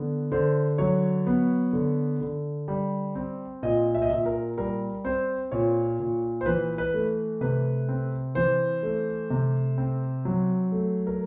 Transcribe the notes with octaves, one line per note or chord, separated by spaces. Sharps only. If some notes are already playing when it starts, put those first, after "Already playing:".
Already playing: D3 B3
D3 C5
F#3 C#5
B3
D3
D3
G3
C4
A#2 D#5
E5
D#5
A#2 E5
A#4
G3 A#4
C4 C5
A#2 C#5
A#2
C5
E3 B4
B4
A3
C3 B4
C4
E3 C5
A3
C3
C4
F#3
A3
A#4